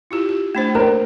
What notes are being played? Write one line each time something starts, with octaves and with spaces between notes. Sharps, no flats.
E4 F4 G4
G4
A3 D4 C5
A#3 A#4 C5